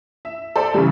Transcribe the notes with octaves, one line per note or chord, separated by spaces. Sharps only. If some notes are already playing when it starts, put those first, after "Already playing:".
E5
A4 C5 D5
C#3 E3 G3